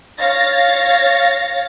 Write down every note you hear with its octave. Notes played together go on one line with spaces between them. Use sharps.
C#5 F5 A6 A#6